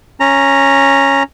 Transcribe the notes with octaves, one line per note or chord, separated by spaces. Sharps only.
C#4 A#5